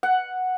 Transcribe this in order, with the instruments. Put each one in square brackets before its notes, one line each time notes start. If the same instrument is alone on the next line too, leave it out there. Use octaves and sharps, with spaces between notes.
[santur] F#5